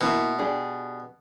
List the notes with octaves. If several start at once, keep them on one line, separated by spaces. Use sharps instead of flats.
B2 A#3 E4
D4 G4 G#4